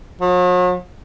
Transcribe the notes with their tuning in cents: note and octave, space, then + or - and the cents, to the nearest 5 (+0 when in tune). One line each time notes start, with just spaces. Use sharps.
F#3 -45